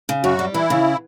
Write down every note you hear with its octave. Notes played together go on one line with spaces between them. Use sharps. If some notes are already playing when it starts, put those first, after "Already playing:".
C#3
F#2 F#4
G3
E3 E4
C#3